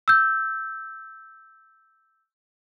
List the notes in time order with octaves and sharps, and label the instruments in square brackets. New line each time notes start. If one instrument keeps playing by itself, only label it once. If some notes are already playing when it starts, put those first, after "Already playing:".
[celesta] E6 G6